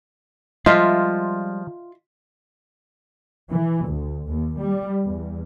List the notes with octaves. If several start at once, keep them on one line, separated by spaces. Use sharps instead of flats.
F3 G3 G#3 F4 D#5 E5
E3
D2
D#2
G3
E2